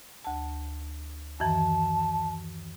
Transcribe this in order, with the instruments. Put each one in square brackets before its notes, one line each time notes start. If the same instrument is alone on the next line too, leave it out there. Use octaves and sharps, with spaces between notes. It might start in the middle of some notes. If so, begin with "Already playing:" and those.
[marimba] D2 A5
[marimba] F#2 D#3 E3 [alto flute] A5